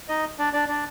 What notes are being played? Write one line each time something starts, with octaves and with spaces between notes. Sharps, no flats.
D#4 D#5
D4 D5
D4 D5
D4 D5